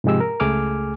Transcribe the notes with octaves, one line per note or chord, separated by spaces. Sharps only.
G#2 C3 F3 G#3 G4 E6
A#4
C#2 A3 G#4 G#5 D6 F6